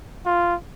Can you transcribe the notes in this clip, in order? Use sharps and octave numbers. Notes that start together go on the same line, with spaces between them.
F4